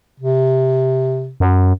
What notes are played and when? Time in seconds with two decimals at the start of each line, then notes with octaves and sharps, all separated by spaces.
0.20 C3
1.40 F#2